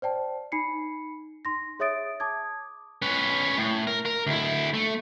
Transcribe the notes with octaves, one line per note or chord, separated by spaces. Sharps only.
C5 D5 G5 A5
D#4 B5 C7 C#7
D#4 C6 A#6
G#4 C#5 E5 D#6 A6 D7
A5 D6 D#6 G#6
C#4 B4
A2
A#4
A#4
D2 E4
A3